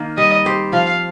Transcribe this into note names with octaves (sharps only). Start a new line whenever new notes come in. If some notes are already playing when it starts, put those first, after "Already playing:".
Already playing: D#3 A#3
G3 D#5
C4 G4 C5
F3 F5